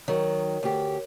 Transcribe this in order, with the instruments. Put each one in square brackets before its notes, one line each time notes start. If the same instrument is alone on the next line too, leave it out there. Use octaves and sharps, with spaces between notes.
[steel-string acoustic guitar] D#3 F#3 [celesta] A#4 C#5
[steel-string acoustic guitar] D2 G4